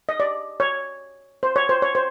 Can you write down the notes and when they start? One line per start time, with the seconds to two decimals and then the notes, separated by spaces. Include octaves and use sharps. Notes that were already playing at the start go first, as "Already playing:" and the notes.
0.09 D#5
0.20 D5
0.60 C#5
1.43 C5
1.56 C#5
1.69 C5
1.82 C#5
1.95 C5